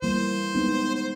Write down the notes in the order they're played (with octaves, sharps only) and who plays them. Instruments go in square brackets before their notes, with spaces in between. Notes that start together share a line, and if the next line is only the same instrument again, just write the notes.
[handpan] E3 G3 A#3 [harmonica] C5
[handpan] G#3 B3 D#4
[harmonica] C5